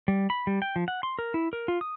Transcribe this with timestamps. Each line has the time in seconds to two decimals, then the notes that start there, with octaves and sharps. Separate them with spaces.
0.08 G3
0.30 B5
0.47 G3
0.62 G5
0.76 F3
0.88 F#5
1.03 C6
1.19 A#4
1.34 E4
1.53 A#4
1.68 F4
1.81 D#6